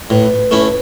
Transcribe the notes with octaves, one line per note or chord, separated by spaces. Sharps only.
A2 B4
A3 C#4 E4